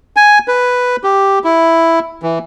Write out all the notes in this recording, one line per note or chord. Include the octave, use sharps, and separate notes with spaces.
G#5
B4
G4
E4
E3